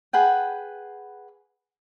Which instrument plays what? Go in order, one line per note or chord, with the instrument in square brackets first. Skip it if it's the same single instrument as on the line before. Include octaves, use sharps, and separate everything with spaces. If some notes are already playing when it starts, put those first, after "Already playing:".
[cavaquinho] G#4 B4 F#5 G5